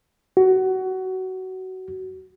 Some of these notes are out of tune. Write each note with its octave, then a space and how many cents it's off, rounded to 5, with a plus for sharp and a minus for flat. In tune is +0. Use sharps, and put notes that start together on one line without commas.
F#4 +20